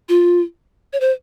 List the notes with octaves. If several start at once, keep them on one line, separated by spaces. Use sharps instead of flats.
F4
C#5
C5